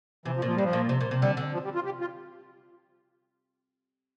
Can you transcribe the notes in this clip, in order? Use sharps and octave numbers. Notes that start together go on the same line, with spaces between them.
C3 E3
F3
A#2
F3
G2 G3
F3
A#2
C3
A#2
C3
D3 G3
D3
F3
G3
F4
G4
F4